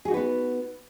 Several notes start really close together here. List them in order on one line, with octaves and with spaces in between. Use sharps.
G#4 F#4 D#4 B4 B3